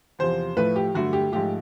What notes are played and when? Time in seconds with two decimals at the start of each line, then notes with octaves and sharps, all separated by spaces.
0.19 E2 C3 F3 C5
0.57 A2 F3 A3 B4
0.76 G4
0.95 G2 D3 F#3 A3 F#4
1.13 G4
1.32 G#2 F3 A3 G4